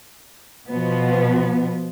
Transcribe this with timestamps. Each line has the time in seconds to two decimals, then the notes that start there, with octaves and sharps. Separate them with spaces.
0.69 B2 F3 B3